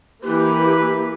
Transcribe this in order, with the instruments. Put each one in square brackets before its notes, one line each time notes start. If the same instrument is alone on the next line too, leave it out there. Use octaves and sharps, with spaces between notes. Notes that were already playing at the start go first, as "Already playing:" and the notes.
[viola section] E3 A#3 [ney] G4 [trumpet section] B4